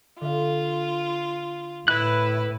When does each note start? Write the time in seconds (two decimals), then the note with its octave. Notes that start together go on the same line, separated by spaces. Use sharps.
0.21 D3 F4 E5 F5
1.88 A2 E4 B4 F#6